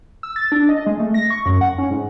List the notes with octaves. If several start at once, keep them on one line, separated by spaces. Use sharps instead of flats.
E6
A6
D4
D#5
G#3
A3
A#6
C#6
F#2
F#5
C#4
G#2